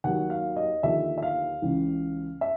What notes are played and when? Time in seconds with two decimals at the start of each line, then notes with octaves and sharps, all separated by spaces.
0.04 D#2 D#3 F#3 F#5
0.30 F5
0.56 D#5
0.83 D#2 D3 F3 E5
1.18 E5
1.22 F5
1.62 C#2 C#3 E3
2.41 E5